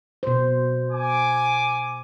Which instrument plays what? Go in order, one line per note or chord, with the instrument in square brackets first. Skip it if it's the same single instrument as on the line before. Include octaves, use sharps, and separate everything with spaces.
[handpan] B2 C5
[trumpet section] G#5 D6